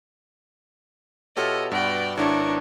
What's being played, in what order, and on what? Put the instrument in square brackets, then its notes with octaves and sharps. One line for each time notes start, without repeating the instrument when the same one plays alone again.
[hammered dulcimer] B2 F4 E5 [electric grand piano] G4 A4 C#5 [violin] D#5
[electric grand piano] G2 [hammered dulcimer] B3 F#4 [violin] D5 G5
[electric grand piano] G#1 E4 [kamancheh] D4 [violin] A#4 C#6 [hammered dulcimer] C#5 F#5 G5